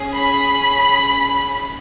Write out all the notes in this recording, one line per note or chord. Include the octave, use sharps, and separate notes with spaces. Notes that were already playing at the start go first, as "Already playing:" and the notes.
Already playing: C#4 G#4
B5